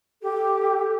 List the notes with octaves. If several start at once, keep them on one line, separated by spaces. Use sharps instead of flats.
G4 A4